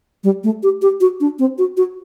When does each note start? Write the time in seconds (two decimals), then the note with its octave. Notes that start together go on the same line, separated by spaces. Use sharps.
0.24 G3
0.44 A3
0.63 G4
0.82 G4
1.01 F#4
1.20 D4
1.39 C4
1.58 F#4
1.77 F#4